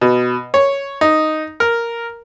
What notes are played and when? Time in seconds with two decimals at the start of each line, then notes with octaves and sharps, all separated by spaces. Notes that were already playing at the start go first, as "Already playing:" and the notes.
0.01 B2
0.54 C#5
1.01 D#4
1.60 A#4